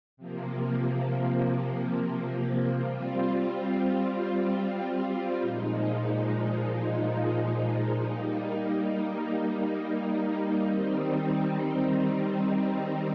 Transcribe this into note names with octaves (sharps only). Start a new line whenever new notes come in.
C3 F3 A#3
G3 C4 F4
A#2 F3 G#3 D#4
G3 A#3 D#4
D#3 G3 C4 D#4